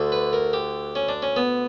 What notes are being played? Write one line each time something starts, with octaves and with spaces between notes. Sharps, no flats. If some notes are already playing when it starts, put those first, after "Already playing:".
Already playing: D2 D3
B4
A#4
G4
C#4
D4
C#4
B3